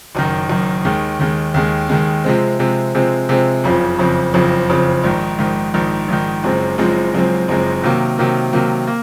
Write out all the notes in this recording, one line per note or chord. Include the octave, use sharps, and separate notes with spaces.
F#1 F#2 D#3
F#1 F#2 D#3
D#2 D#3 G#3
D#2 D#3 G#3
D#2 D#3 G#3
D#2 D#3 G#3
C3 F3 G#3 C4
C3 F3 G#3 C4
C3 F3 G#3 C4
C3 F3 G#3 C4
F#1 F2 C#3 F3 C4
F#1 F2 C#3 F3 C4
F#1 F2 C#3 F3 C4
F#1 F2 C#3 F3 C4
A#1 G#2 D#3
A#1 G#2 D#3
A#1 G#2 D#3
A#1 G#2 D#3
F#1 F#2 F3 G#3 C4
F#1 F#2 F3 G#3 C4
F#1 F#2 F3 G#3 C4
F#1 F#2 F3 G#3 C4
C3 D#3 F#3 A#3
C3 D#3 F#3 A#3
C3 D#3 F#3 A#3
A#3